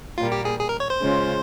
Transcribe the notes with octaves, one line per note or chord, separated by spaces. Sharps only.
A#2 G3 A#3 F4
G4
G#4
G#4
A#4
C#5
C5
C#3 G#3 C#4 F4